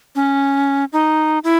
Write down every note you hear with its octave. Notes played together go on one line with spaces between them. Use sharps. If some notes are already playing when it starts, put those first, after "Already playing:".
C#4
D#4
E4